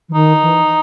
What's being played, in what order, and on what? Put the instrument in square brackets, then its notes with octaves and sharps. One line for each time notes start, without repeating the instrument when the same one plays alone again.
[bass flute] E3
[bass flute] D#3 [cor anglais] D#4
[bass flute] E3